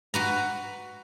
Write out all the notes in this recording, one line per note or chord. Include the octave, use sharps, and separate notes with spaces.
F#4 B4 A#5